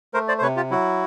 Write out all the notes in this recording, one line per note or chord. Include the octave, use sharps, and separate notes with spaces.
A3 A#4 C5
C5 D5
C5
C3 B4 C#5
F4 G4
F#3 E4 F#4